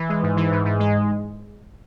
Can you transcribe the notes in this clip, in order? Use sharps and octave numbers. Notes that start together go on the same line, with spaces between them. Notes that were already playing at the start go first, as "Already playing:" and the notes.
Already playing: E3
G#3
G#2
E3
G#2
G#2
G#3